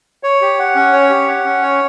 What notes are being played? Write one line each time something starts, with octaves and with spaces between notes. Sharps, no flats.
C#5
G4
F#5
C#4
C#5
G4
F#5
C#4
C#5